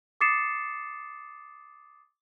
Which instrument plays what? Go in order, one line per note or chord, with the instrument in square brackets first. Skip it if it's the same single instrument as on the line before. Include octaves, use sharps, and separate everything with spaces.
[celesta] D6 D#6 A6 C7 C#7 E7